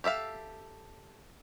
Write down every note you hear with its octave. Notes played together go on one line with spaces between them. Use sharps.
G4 A4 E5 F5